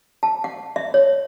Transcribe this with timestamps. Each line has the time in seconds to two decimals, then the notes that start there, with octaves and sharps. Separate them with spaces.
0.23 A5
0.44 F#5
0.76 E5
0.94 C#5